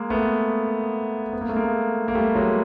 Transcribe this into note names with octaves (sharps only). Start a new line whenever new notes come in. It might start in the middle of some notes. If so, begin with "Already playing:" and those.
Already playing: G#3 A#3
A3 B3
B3
A#3
A3
G#3 A#3
A#3
G3 A3
F#3 G#3